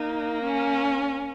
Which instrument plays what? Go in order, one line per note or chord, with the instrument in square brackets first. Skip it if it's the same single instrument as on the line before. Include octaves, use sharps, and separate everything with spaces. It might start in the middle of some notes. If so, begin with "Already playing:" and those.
Already playing: [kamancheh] A#3 [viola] D#4
[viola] C#4